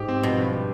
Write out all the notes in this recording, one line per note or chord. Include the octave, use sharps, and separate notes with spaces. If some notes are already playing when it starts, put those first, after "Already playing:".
Already playing: G#2 G4
C4
B2 F3
G2
G4